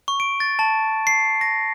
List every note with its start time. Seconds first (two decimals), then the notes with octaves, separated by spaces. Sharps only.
0.08 C#6
0.20 D7
0.40 A6
0.59 A5
1.07 C7
1.41 A#6